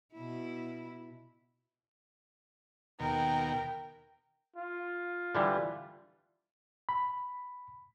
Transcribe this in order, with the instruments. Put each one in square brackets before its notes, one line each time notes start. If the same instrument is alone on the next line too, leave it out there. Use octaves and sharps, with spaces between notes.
[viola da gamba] B2 E4
[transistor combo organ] D#2 B2 [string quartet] A#4 G5
[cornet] F4
[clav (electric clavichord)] D3 E3 G3
[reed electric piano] B5